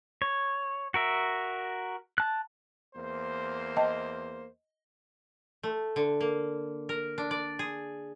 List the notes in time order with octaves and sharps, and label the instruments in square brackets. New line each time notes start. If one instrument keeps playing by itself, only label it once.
[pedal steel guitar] C#5
F#4 A#4 E5
A5 F#6
[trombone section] E2 A#3 C5
[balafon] D#5 G5 A5
[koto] A3
D3
A#3
A#4
D4
D5
G#4